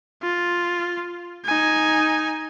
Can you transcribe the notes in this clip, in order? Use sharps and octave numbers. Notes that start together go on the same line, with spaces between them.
F4
D#4 G#5